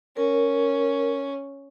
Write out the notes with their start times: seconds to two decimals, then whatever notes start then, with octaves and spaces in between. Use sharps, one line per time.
0.17 C#4 A#4